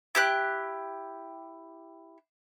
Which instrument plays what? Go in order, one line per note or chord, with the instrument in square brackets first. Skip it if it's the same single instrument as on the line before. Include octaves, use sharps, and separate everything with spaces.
[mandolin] E4 G4 F#6